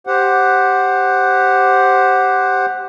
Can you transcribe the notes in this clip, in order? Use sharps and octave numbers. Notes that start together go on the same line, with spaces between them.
G4 C5 F#5